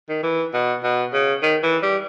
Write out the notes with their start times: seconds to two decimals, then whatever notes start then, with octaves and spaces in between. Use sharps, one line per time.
0.09 D#3
0.23 E3
0.54 B2
0.83 B2
1.13 C#3
1.43 D#3
1.63 E3
1.83 G3